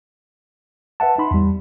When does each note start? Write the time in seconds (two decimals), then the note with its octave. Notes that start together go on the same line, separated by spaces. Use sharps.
1.00 B4 E5 F#5 A5
1.18 D#4 B5 C6
1.31 E2 G3